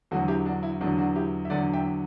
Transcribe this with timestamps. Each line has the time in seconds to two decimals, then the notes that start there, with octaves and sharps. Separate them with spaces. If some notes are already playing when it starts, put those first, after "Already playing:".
0.11 E2 D3 F#3 F#4 A4
0.28 E4 G4
0.45 D4 F#4
0.63 E4
0.81 E2 D3 F#3 D4 F#4
0.98 D4 F#4
1.16 E4 G4
1.45 E5
1.50 E2 D3 F#3 D5 F#5
1.74 E5 G5